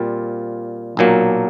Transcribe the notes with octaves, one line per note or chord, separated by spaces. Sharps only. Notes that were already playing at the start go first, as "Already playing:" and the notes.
Already playing: A#2 G3 C4 F4
B1 A#2 F#3 A#3